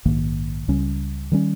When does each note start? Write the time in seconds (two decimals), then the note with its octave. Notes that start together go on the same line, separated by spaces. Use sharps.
0.05 A#1 G#2 D#3 A#3
0.68 C#2 C#3 G3 C#4
1.32 D#3 G3 C#4